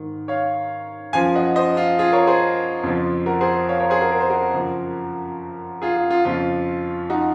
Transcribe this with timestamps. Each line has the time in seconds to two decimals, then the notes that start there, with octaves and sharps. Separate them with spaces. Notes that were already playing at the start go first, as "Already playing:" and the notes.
Already playing: G#2 D#3
0.28 C#5 F5
1.13 F#2 F3 F5 G#5
1.35 D#5 F#5
1.56 C5 D#5
1.77 F4
1.99 F4 G#4
2.12 A#4 C#5
2.27 G#4 C5
2.83 F2 C#3 F3
3.26 F#4 A#4
3.41 G#4 C5
3.69 C#5 F5
3.80 A#4 C#5
3.90 G#4 C5
4.01 F#4 A#4
4.12 A#4
4.21 C5
4.30 F#4 A#4
4.54 F#2 C#3 F3
5.82 F4 G#4
5.96 F4
6.11 F4
6.25 F2 C#3 F3 F4
7.10 D#4 F#4